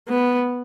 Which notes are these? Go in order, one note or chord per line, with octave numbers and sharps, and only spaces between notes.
B3